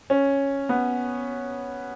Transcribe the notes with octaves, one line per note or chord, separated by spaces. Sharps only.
C#4
B3